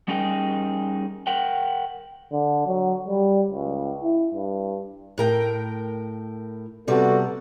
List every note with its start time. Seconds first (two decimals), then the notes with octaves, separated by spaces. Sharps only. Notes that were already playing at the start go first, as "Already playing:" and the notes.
0.08 G3 C#4 D#4 G#4 A#4 G5
1.27 A#4 F#5 G5
2.32 D3
2.67 F#3
3.08 G3
3.50 C#2
4.03 E4
4.34 G2
5.18 A2 A#4 G5
6.88 C3 G3 B3 F#4 A4 D5